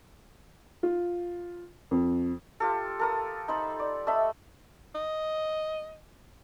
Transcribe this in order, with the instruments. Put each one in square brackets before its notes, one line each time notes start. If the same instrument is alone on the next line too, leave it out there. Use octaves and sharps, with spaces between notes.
[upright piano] F4
F2
[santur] F4 G4 A4
A4 A#4 D#6
D#4 C5 B5
D5
A3 D#5 E5 B5
[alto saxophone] D#5